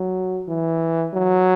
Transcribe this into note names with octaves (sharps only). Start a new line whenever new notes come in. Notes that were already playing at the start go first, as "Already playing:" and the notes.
Already playing: F#3
E3
F#3